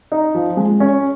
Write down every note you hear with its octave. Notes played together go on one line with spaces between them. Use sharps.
D#4
F3
G#3
C#4